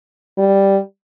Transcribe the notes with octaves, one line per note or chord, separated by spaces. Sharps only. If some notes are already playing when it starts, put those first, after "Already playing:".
G3